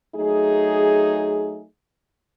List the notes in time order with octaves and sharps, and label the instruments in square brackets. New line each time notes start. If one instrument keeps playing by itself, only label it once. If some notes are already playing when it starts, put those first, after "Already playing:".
[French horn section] F#3 A3 D#4 G#4